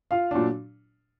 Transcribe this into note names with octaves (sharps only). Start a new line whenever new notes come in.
F4 F5
A#2 F#3 D4